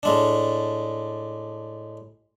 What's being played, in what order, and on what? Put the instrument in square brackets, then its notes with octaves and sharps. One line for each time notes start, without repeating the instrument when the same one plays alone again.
[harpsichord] A2 G#3 D4